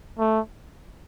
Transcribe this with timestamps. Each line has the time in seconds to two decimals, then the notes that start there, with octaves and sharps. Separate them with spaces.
0.19 A3